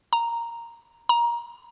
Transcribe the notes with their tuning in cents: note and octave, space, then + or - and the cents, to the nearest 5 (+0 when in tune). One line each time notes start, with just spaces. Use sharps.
A#5 -5
A#5 +20